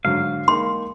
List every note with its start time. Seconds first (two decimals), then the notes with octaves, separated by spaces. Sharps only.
0.05 G#2 D3 F#3 F5
0.48 G#3 A#3 D#4 C6